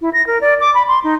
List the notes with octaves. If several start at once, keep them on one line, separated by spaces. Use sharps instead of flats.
E4
A#6
A#4
D5
D6
B5
C6
D#4